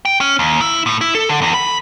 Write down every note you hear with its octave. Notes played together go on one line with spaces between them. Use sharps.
G5
C#4
D#2
E4
A2
E4
A4
D3
E2
B5